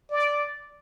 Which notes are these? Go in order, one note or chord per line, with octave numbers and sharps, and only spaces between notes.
D5